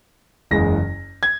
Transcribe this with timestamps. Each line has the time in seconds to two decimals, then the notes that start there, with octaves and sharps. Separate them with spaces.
0.51 F#1 E2 C#3 G#3 A#6
1.23 G#6